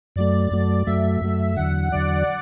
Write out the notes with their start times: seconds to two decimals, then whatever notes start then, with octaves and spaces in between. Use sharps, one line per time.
0.16 F#2 F#3 A3 D5
0.51 F#2 F#3 A3 D5
0.86 F#2 F#3 A3 E5
1.21 F#2 F#3 A3
1.56 E2 D3 F#3 F#5
1.92 E2 D3 F#3 D5